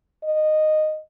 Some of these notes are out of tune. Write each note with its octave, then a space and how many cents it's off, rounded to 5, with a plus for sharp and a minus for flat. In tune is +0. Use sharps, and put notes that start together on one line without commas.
D#5 -10